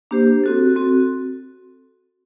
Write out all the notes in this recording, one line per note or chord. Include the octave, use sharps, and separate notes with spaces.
A#3 D4 G4 C5
C4 F#4 A4
C4 F#4 A4